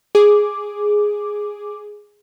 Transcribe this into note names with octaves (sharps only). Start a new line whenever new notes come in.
G#4 D6